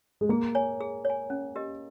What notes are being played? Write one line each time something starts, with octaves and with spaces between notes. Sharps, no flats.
G#3
A#3 G#4
C#5 G#5
G#4
C#5 G#5
C#4
G4 A#4 D#5